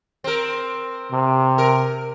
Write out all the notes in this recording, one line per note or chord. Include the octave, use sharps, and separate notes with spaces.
C4 A#4
C3
A#4